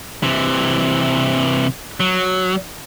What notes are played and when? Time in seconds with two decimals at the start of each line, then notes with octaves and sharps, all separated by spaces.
0.23 C3 E3
2.00 F#3